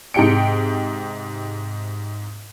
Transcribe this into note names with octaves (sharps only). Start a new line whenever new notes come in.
G#2 C3 G4 G5 C#7 D7